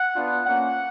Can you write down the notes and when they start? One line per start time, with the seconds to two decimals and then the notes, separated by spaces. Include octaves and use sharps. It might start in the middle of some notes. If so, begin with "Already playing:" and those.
Already playing: F#5
0.15 B3 D4 F4
0.44 A#3 C#4 F4 F#5